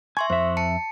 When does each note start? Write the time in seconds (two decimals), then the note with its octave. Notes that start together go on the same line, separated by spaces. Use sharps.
0.17 E5 G#5 C6 C#6
0.30 F2 C5 E5
0.57 A5 C#7